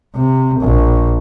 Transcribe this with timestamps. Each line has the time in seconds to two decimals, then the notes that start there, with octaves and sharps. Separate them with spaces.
0.16 C3
0.61 A#1